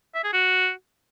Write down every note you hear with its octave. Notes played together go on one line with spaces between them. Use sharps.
E5
G#4
F#4